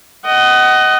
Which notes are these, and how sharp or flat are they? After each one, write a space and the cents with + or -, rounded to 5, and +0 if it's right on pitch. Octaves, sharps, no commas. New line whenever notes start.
D#5 +0 F#5 +30